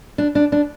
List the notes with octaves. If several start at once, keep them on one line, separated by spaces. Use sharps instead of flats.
D4
D4
D4